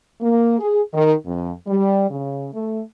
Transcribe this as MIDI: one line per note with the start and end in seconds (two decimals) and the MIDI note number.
0.20 0.56 58
0.59 0.80 68
0.92 1.13 51
1.24 1.51 41
1.66 2.06 55
2.09 2.47 49
2.52 2.80 57